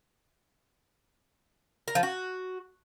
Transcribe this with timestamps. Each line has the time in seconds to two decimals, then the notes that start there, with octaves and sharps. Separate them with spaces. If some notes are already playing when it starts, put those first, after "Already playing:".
1.88 A#4
1.95 F3
2.03 F#4